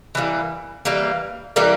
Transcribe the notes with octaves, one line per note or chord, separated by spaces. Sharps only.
E3 G3 A#3
E3 G3 A#3
E3 G3 A#3